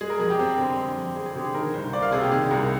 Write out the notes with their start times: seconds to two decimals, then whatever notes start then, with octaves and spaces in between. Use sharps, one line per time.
0.01 G#3 G#4
0.10 A#4
0.19 F2 G#4
0.30 G4
0.39 C4
0.58 D3
0.77 G#3
0.97 F2
1.16 C4 G#4
1.26 G#4
1.35 D3 G4
1.45 G#4
1.54 D#3 A#4
1.74 C2 C5
1.93 A#3 D5
2.02 F5
2.12 C3 G#4
2.21 G4
2.31 D#3 G#4
2.51 C2 A#4